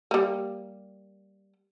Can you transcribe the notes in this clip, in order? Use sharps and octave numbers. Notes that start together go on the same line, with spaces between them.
G3 A#3